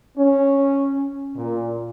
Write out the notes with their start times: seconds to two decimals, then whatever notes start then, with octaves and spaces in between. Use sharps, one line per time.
0.16 C#4
1.35 A#2